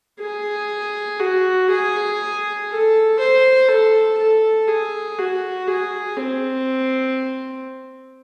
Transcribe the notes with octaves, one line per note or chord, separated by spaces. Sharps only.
G#4
F#4
G#4
A4
C5
A4
A4
G#4
F#4
G#4
C4